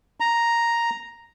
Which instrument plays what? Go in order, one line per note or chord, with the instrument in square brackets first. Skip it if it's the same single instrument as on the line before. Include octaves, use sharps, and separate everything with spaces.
[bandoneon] A#5